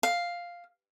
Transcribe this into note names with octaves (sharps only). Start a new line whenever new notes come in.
F5